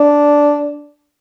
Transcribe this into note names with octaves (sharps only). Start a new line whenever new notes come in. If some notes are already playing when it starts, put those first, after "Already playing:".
Already playing: D4